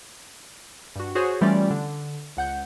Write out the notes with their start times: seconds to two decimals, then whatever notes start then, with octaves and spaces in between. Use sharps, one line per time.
0.96 G2 F#4
1.15 F#4 G#4 C5 C#5
1.41 E3 G3 A3 C#4 F4 D5
1.70 D3
2.37 C#2 F#5 G6